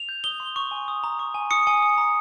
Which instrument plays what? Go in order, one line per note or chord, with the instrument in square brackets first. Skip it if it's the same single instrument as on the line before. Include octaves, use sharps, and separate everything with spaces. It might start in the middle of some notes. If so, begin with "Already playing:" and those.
Already playing: [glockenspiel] F7
G6
D#6 G7
C6
C#6
G#5
D#6
A#5
C#6
G#5
D#6 C#7
G#5
D#6
A#5